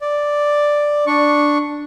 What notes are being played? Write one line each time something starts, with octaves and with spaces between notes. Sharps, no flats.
D5
D4 C#6